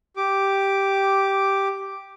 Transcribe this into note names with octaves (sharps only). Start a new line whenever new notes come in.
G4 D6